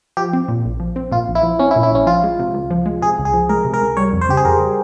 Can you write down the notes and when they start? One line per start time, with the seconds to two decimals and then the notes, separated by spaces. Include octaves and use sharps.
0.17 F3 G4
0.33 C4
0.48 A#2
0.65 A#1
0.80 F3
0.96 C4
1.12 A#2 F4
1.28 A#1
1.35 E4
1.43 F3
1.59 C4 C#4
1.71 E4
1.76 A#2
1.83 E4
1.91 A#1 C#4
2.06 F3 F4
2.23 G#3
2.39 C3
2.54 C#2
2.70 F3
2.86 G#3
3.02 C3 G#4
3.18 C#2
3.25 G#4
3.34 F3
3.49 G#3 A#4
3.65 C3
3.74 A#4
3.81 C#2
3.97 G3 C#5
4.13 F2
4.21 C5
4.29 C#3 G4
4.37 G#4
4.45 F2 A#4
4.60 G3